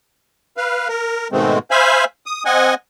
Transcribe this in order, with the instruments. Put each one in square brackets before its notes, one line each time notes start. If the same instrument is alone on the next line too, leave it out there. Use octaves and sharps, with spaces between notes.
[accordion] B4 F5
A#4
G#2 B2 D#3 G#3 A3 C4
C5 E5 F5 G#5 B5
D#6
C4 D#5 F#5 G#5